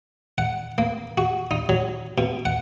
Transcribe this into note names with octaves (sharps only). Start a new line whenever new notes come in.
F#5
A#3
F#4
D#4
F#3
B2
F#5